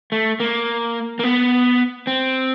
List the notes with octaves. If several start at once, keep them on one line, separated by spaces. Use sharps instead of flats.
A3
A#3
A#3
B3
C4